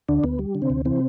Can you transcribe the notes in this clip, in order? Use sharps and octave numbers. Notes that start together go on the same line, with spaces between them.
D2 D3 D4
D2 B3
G3
D3
C3 C4
D2
C3 E3 C4